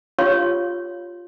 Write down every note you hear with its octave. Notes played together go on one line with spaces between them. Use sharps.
F4 G4 C#5 F5 C6